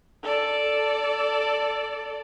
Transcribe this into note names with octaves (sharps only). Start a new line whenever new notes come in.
A4 D5